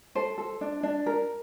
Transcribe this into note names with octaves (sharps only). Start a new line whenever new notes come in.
A4 C5
A4
D4
D4
A#4